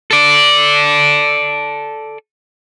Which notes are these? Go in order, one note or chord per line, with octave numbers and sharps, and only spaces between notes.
A4 D5